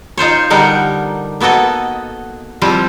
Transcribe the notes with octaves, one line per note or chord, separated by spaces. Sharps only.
D#4 F4 C5 C#5
D3 G3 D#4 A#4 F#5
A#3 B3 F#4 A4 D#5
F3 G3 C4 E4 F4